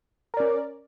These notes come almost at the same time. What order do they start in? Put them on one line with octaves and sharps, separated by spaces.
A#4 D5 C#4